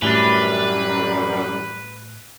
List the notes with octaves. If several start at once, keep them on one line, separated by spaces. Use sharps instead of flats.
F#2 A2 E3 G3 D4 B4